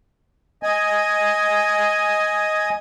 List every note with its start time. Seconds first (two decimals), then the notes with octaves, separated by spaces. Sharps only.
0.63 D#5 G#5